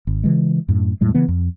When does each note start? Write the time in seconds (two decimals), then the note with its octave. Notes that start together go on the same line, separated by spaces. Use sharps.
0.07 G#1
0.24 C#3 E3 G#3
0.69 F#2 A2
1.01 E2 A2 G3 G#3
1.14 C#3 E3 B3
1.28 F2